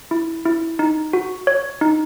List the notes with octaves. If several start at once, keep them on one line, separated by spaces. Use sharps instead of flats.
E4
E4
D#4
F#4
C#5
D#4